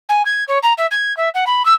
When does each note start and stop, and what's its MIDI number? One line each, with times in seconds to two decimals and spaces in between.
0.09 0.22 80
0.25 0.44 92
0.48 0.58 73
0.63 0.73 82
0.78 0.86 76
0.91 1.15 92
1.17 1.29 76
1.34 1.44 78
1.46 1.65 83
1.65 1.73 88